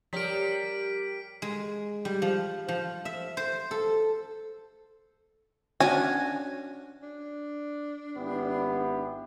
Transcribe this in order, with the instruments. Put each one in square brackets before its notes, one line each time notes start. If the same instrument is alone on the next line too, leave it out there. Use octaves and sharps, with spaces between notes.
[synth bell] F3 C#5 D5 [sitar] G3 [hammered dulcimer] G4 A#4 [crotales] B6 D7
[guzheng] G#3
G3
F3
F3
E5
C5
A4
[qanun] C#4 D4 F#4 [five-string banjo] G#5
[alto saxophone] D4
[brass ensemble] G#1 E4 G4 [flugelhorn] B3